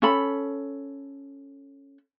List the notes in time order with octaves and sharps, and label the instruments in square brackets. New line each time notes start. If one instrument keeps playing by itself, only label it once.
[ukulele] C#4 A4 B5